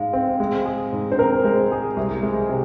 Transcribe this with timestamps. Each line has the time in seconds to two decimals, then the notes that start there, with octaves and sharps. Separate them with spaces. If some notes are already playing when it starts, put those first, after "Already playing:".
Already playing: G#2 G#3 F5
0.13 C4
0.40 G#3
0.65 G#4
0.92 G#2
1.12 C5
1.18 C4 A#4
1.45 G#3
1.71 G#4
1.97 C2
2.23 G#3
2.49 C3